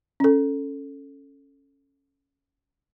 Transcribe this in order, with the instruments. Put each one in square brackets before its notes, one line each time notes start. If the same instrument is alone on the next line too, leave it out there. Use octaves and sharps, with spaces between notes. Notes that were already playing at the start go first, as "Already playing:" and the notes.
[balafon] C#4 A4